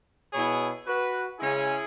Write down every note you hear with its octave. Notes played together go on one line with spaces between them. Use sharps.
B2 B3 E4 G#4 C#5
F#4 B4
C#3 G#3 C#4 E4 G#4